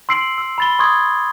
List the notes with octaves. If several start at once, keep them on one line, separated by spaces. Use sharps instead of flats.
C6 E6 C7 D7 F#7
E6
B5 A6 G7
C6 C#6 D#6 G#6